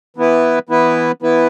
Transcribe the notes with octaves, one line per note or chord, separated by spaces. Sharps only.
E3 B3 E4 B4
E3 B3 E4 B4
E3 B3 E4 B4